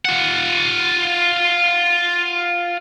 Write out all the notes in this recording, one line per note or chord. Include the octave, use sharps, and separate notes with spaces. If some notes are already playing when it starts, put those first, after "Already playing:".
F4 F#5